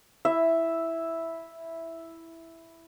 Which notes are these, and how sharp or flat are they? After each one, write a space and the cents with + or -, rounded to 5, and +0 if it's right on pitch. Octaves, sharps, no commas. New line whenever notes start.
E4 +0 E5 +0